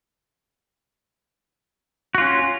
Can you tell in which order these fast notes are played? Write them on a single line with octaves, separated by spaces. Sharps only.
F#4 F4 C#4